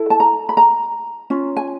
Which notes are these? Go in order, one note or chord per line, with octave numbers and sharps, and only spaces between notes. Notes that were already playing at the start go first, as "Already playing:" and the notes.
Already playing: E4 A4
A5
A#5
B5
A#5
C#4 F4
G#5